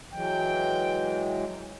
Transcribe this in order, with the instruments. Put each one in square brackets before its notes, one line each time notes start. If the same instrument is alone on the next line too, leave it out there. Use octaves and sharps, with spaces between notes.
[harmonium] E3 F#3 G#3 [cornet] G5